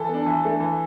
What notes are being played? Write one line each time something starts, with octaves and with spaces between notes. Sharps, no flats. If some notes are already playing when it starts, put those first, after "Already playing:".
Already playing: E3 A4
B3
D4
E3
A3 D4
E3